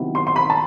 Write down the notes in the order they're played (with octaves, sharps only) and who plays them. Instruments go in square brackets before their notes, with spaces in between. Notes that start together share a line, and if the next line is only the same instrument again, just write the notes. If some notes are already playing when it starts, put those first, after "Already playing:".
Already playing: [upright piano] C3 D#3 F#3 B3 E4
C6
C6
B5
A5